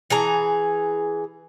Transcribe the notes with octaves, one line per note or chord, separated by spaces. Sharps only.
E3 G#4 A#5